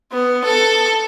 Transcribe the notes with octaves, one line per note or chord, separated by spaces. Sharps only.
B3
A4